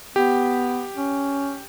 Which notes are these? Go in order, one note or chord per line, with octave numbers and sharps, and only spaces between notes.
B3 G4
C#4